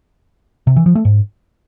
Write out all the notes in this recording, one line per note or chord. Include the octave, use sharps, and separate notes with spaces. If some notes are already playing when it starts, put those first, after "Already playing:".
C3
E3
F3
A3
G#2